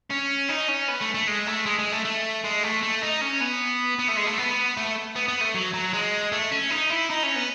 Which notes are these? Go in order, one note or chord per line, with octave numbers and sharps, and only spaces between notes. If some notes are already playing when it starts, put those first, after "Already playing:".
C#4
D#4
C#4
B3
A3
A3
G#3
A3
G#3
G#3
A3
A3
G#3
A3
A3
D#4
C#4
B3
B3
A3
G#3
A3
B3
A3
B3
B3
A3
F#3
F#3
G#3
A3
C#4
D#4
E4
D#4
C#4
B3